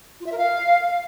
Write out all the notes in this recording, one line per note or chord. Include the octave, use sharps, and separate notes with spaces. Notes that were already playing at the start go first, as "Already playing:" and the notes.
F4
E5
A#4
F5